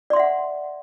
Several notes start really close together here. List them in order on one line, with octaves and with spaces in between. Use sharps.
D5 C6 E5 F#5